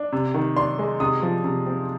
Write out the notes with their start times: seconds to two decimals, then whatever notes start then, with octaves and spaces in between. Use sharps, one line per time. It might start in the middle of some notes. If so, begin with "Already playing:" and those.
Already playing: D4
0.12 C3
0.34 D#3
0.57 D4 C6
0.79 G#3
1.00 C3 D#6
1.22 F3
1.44 C3
1.66 C4